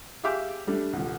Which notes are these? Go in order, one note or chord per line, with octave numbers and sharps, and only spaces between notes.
G4 G#4 E5 F5 D6 G6
G3 A3 D4
D#1 C2